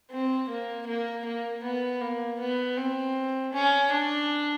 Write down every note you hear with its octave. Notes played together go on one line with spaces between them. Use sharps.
C4
A#3
A#3
A#3
B3
A#3
B3
C4
C#4
D4